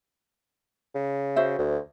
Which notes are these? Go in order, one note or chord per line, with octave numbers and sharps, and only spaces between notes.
C#3
F#4 C5 E5
D2